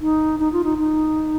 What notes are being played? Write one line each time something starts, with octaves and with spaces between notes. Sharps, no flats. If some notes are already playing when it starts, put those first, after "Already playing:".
D#4
D#4
F4
D#4
D#4